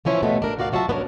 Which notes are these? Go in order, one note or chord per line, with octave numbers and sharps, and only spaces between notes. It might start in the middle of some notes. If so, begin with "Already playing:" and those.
E3 F3 C#4 E4 F4
G2 B2 A3 B3 C4
D4 A#4
D2 F#4 D5 F5
F#3 F4 F#4 C#5 E5 A5
B3 C#4 D4 A#4 C#5